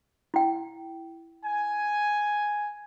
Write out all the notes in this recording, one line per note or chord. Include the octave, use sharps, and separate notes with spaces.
E4 G5
G#5